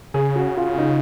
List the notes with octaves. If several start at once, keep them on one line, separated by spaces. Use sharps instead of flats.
C#3 G#4
F#4
F4
D#4